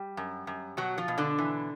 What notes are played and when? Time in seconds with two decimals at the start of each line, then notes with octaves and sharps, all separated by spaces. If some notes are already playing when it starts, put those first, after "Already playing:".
Already playing: G3 G4
0.17 F#2
0.47 F#2
0.77 B2 F#3 F#4
0.98 F3 F4
1.08 B2
1.18 D3 D4
1.38 E3